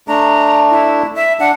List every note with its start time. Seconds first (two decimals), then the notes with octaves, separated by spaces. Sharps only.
0.08 A3 D4 A#5
0.70 E4
1.15 E5
1.40 D4 F#5